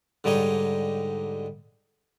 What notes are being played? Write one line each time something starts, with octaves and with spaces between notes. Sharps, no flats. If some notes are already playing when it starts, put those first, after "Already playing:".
G#2 D3 G3 D#4 C#5 D#5